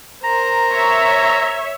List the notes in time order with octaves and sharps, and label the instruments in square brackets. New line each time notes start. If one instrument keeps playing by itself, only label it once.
[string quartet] A#4 C5 [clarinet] A#5
[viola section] C#5 E5